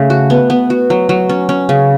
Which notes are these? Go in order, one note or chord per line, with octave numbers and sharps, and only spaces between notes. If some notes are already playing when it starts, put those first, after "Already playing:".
Already playing: C#3 A3
F#4
B3
B3
F#4
F#3
F#3
C#4
C#4
C#3